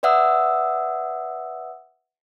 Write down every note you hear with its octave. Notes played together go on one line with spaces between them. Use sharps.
B4 D5 E5 F#5 D#6 E6